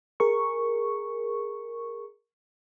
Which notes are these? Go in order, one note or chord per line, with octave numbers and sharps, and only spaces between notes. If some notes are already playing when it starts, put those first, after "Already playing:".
G#4 A#4 C#6